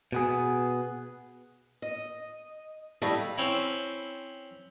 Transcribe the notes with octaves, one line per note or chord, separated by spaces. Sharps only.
B2 B3 G#4
D#5
G3 A3 E4 D#5 F5
C4 C#4 E4